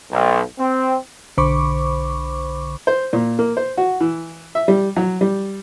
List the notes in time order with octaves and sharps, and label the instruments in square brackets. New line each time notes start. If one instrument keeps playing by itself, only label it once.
[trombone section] B1
C4
[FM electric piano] B1 D3 C5 B5 C#6 D6
[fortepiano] C5
A#2
A#3
C5
F#4
E3
E5
G3
F#3
G3